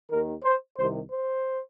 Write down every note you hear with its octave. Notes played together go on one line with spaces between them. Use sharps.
D#2 D#3 A#4
C5
C2 C3 D#3 C5
C5